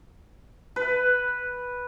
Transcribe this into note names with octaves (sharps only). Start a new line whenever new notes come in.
B4